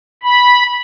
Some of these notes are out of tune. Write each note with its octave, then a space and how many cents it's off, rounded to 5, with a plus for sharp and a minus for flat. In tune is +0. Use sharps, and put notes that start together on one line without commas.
B5 -10